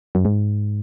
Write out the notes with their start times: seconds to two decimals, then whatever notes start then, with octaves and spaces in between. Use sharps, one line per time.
0.15 F#2
0.25 G#2